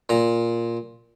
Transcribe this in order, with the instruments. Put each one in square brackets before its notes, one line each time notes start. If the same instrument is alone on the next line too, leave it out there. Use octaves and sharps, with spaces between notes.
[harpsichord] A#2 A#5